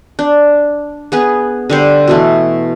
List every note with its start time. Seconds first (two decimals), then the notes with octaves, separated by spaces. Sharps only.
0.19 D4
1.12 B3 G#4 B4
1.70 D3 G3 C5
2.08 B2 E3 A3